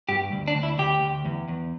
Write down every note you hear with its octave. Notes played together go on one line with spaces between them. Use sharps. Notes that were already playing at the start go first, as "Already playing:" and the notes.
G2 G4
D2
D4
D2
E4
D2 G4
D2
E2
E2